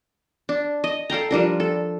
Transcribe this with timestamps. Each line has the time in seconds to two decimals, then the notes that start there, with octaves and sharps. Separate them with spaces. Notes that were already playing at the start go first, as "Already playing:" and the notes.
0.49 D4
0.84 D#5
1.10 A4 F5 G5 A#5
1.31 F3 G3 D4 A#4
1.60 A4